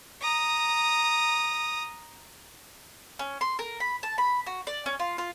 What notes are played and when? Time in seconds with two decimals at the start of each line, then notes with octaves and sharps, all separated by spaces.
0.21 A#5 D#6
3.19 C#4
3.41 C6
3.59 A#4
3.80 B5
4.03 A5
4.18 B5
4.46 F#4
4.67 D5
4.86 C#4
4.99 F4
5.18 F4